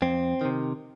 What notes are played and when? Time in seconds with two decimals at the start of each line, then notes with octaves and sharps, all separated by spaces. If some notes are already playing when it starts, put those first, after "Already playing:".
0.02 F2 C4
0.41 C3 D#3